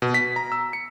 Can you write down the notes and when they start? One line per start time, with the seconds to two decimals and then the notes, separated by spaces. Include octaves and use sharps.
0.02 B2
0.14 B6
0.36 A#5
0.52 E6
0.73 C#7